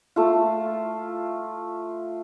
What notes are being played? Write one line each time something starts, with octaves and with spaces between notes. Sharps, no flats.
A3 F4